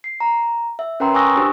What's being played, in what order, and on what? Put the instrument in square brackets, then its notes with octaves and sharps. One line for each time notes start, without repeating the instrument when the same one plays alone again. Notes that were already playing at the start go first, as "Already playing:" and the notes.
[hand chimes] C7
A#5
E5
C#4 A#4 B4 G5 A#5 C6
G#5 C#6 D#6 E6 F#6 A#6
D4 G4 C5